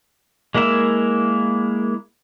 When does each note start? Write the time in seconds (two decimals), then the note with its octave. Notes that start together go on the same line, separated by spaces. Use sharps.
0.55 G#3 A#3 E4 A#4 E5